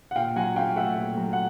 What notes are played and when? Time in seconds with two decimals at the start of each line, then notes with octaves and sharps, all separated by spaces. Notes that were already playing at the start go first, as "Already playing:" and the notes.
0.11 F#5
0.16 A#2 F5 G5
0.36 F#3 F#5 G#5
0.56 C#4 F5 G5
0.76 A3 E5 F#5
0.97 A#2
1.17 F#3
1.33 F#5